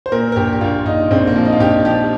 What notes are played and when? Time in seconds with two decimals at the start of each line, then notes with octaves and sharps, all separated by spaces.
0.06 C5
0.12 A#2 A#4
0.32 A#4
0.36 A#1 G4
0.53 G4
0.61 A#1 F4
0.86 A#1 D#4
1.11 A#1 C4
1.27 A#3
1.36 F3
1.45 D#4
1.53 F4
1.60 A#1 G4
1.85 F3 G4